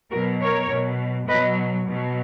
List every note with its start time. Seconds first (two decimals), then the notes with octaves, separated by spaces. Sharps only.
0.12 B2 F#3 F#4 A#4
0.42 A#4 C#5
0.70 B2 F#3
1.28 B2 F#3 B4 D#5
1.87 B2 F#3